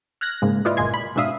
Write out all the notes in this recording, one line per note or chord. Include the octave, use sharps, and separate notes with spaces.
F6 F#6 G#6 A#6
G#2 C#3 G#3 A#3
E4 F4 B4 D5 D#5
G1 A#2 D#5 G#5 C6 G#6
B5
G#2 B2 D4 E5 F5 D#6